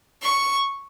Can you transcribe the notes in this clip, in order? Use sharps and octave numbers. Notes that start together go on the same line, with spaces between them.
C#6